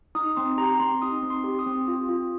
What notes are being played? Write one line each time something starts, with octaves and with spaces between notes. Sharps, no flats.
D#4 D#6
C4 C6
G4 A#5
C4 C6
D#4 D#6
C4
C6
G4
D#6
C4
F4
F4